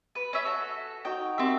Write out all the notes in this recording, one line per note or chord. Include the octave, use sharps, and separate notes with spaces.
B4
C#4 E5
F#4 A4
D#4 F#4 G5 A#5
A#3 C4 G4 E5